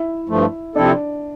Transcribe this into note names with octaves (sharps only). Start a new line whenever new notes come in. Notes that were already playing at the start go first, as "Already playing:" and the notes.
Already playing: E4 E5
G2 F3 A3
C3 F3 C4 D4 E4 A4 D5